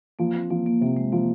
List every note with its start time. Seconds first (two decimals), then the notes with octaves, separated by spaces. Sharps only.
0.19 F3 A#3
0.35 C4
0.50 F3 A#3
0.66 A#3
0.81 C3 A#3
0.97 G#3
1.12 F3 A#3